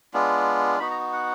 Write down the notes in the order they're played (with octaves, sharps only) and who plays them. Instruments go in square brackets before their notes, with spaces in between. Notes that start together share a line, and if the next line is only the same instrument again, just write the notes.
[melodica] G#3 B3 D4 F4
B3 D#4 F#4 B5
A#5
F#5